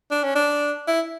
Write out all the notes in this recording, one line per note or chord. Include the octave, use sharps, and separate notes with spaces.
D4
C#4
D4
E4